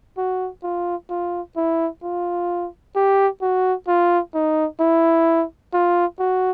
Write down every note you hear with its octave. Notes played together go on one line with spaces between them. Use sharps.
F#4
F4
F4
E4
F4
G4
F#4
F4
D#4
E4
F4
F#4